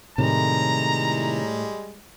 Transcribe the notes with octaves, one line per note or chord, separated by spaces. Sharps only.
A2 C3 D#3 G3 G#3 A#5